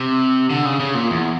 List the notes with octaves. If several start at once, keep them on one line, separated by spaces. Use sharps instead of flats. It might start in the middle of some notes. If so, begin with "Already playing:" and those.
Already playing: C3
D3
C#3
C#3
A#2
E2